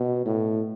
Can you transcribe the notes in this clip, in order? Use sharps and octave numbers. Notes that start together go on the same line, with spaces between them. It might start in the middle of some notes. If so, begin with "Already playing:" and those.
Already playing: B2
A2